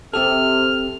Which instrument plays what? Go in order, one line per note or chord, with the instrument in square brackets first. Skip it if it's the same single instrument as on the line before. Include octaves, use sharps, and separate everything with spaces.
[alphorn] C3 [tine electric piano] C4 G4 A4 [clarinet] F6